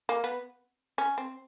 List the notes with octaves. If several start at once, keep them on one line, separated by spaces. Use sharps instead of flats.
A#3
B3
C#4
C4